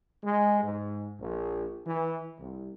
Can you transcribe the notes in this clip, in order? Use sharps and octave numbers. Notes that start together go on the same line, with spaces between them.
G#3
G#2
A#1
E3
C2